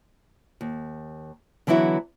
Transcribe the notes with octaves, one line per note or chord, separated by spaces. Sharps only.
D#2
D3 E3 F#3 B3 E4 F#4